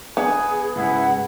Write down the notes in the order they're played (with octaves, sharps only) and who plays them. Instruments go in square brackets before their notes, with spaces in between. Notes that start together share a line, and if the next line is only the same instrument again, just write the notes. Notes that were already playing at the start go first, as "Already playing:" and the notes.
[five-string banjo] B3 [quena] G#4 [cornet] G#5
[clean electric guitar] C#2 G#2 G#4 [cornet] E4 [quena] F#5